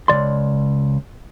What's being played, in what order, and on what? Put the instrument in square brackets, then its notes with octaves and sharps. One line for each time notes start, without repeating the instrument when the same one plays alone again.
[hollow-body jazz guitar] C#2 C3 D5 C6